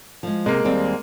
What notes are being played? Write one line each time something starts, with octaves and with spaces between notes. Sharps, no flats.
F3 G#3
C3 G#3 A#3
D#2 G3 C4